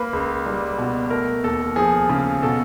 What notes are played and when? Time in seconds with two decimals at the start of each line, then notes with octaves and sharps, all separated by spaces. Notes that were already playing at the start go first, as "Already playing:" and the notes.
Already playing: A#3 B4
0.13 C#2
0.46 G3
0.78 B2
1.10 A3 A#4
1.43 D#2 A4
1.76 F3 G#4
2.09 C#3
2.42 B2 A4